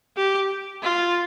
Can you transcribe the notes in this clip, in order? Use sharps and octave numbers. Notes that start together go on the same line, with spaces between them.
G4
F4